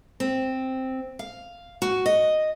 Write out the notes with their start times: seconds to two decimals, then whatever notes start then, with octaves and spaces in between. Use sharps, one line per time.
0.20 C4
1.19 F5
1.82 F#4
2.06 D#5